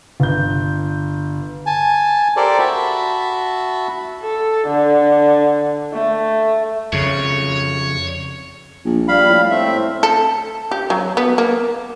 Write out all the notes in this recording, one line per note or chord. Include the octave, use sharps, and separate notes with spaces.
G1 G6
G#5 A5
G4 A4 A#4 C5 D5
F#4 E5 A5 B5
A4
D3
A3
F2 C#3 C#5
A#1
G3 F5 B5
A2
A3 C4 E5
A4
G4
F#3
B3
A#3